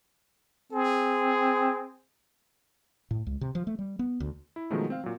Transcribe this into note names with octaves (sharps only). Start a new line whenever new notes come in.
C4 G#4
A2
C#2
C3
F3
A3
G3
B3
D2
E4
B2 D#3 F3 F#3 G#3 A3
C4 F5
A#2 F#3